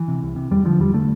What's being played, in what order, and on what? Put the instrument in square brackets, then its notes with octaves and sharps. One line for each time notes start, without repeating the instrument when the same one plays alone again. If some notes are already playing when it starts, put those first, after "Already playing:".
Already playing: [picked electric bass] E3
C3
C2
C3
E2 G3
D3 F3
E2 G3
D3 A3